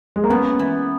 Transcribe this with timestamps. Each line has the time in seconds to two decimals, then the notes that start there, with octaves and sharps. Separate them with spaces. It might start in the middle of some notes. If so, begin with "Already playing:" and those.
0.16 G#3
0.24 A#3
0.30 F#2 B3
0.59 E3